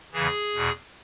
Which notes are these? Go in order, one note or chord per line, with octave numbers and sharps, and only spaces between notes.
E2 C#3 E3 G#4
E2 B2